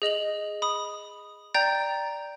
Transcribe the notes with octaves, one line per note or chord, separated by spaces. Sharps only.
G#4 D#5 F7 F#7
B5 D#6
D5 G5 A#5 G6 A6